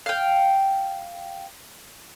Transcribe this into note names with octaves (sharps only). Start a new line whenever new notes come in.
F5 G5